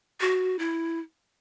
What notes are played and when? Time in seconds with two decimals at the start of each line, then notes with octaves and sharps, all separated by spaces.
0.21 F#4
0.59 E4